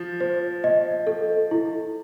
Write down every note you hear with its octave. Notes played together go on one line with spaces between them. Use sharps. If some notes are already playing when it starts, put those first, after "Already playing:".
Already playing: F3
C5
D#5
A4
E4